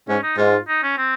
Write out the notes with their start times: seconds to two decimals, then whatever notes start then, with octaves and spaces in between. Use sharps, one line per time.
0.08 G#2 C#4
0.23 D#4
0.38 G#2 F4
0.68 D#4
0.83 C#4
0.98 C4